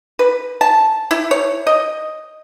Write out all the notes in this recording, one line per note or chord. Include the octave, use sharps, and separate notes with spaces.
B4
A5
E4
C#5
D#5